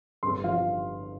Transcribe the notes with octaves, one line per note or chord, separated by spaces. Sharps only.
G1 C6
F3 F5